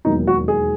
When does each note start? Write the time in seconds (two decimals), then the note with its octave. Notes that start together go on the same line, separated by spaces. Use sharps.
0.05 E1 D#2 D#3 F#3 D#4
0.27 F#4
0.48 G#4